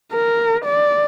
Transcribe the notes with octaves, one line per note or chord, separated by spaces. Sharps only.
A#4
D5